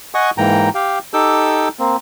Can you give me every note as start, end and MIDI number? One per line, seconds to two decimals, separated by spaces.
0.14 0.30 75
0.14 0.30 78
0.14 0.30 80
0.14 0.30 85
0.14 0.30 87
0.38 0.69 44
0.38 0.69 52
0.38 0.69 58
0.38 0.69 79
0.38 0.69 82
0.75 0.99 67
0.75 0.99 77
0.75 0.99 79
1.14 1.68 63
1.14 1.68 67
1.14 1.68 69
1.14 1.68 86
1.14 1.68 88
1.14 1.68 91
1.79 1.96 58
1.79 1.96 60